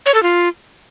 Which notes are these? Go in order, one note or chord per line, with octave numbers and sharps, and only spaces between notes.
C#5
A4
F4